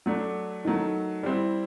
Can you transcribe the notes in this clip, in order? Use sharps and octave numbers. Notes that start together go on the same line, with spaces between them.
F#3 A3 D4
D#3 F#3 A3
G3 C4 E4